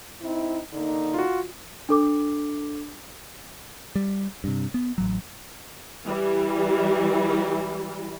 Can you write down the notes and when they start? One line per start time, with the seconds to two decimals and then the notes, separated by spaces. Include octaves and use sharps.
0.22 C4 D#4 E4
0.73 D3 A#3 D#4
1.14 F4 F#4
1.89 D4 A4 D6
3.95 G3
4.44 G2 C3
4.74 B3
4.98 A1 F#3
6.07 E3 G3